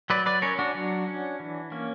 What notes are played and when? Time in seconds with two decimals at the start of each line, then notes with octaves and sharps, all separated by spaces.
0.10 F#3 B4 D5
0.26 B4 D5
0.42 C#4 A#4 C#5
0.59 D4 F#4
0.75 F#3
1.07 C#4
1.40 E3
1.72 A#3 C#4